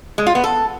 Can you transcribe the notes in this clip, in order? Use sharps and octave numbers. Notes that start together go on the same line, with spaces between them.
G#3
F4
B3
A4